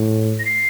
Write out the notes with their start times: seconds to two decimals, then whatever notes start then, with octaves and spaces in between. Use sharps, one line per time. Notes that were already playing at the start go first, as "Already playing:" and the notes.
Already playing: A2
0.39 A#6
0.45 C7